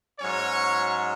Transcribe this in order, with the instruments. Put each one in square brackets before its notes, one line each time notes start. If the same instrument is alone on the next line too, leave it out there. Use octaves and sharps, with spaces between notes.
[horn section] G#2 F#3 C#4 C#5